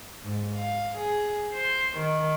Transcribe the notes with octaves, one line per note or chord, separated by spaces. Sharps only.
G#2
F5
G#4
C5
D#3